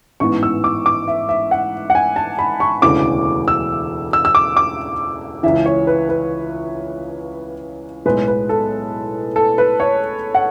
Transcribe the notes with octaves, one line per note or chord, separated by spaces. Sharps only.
A1 G#2 E3 B3 C#6
E6
D6
D6
E5
E5
F#5
F#5
G#5
A5
B5
C#6
E1 D2 C#3 E3 A3 D6
E6
E6
E6
D6
D6
C#2 C#3 E3 E5
C#5
B4
B4
B1 A2 G#3 B4
B4
A4
A4
B4
C#5
F#5